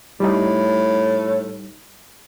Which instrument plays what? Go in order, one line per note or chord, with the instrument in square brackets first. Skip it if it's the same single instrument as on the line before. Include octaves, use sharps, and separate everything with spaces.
[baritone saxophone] A2 [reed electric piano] G3 D#4